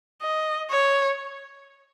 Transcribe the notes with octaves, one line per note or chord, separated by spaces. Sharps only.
D#5
C#5